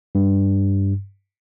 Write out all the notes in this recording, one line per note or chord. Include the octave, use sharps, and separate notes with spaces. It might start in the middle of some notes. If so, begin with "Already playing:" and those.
G2